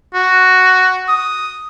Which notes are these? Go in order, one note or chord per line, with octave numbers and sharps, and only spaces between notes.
F#4
D#6